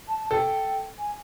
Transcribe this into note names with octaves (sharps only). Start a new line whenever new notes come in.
A5
A4 G5
G#5